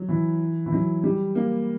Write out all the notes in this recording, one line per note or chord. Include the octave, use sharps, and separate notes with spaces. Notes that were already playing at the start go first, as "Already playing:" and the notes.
Already playing: F#3
E3
E3
F#3
G3
A#3